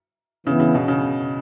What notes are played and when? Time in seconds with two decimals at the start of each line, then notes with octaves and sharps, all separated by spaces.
0.46 C#3 E3 B3 E4
0.60 C#3
0.75 B2
0.88 C#3